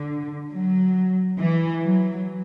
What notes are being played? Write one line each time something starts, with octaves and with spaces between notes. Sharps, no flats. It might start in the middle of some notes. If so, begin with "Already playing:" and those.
Already playing: D3
F#3
E3
F#3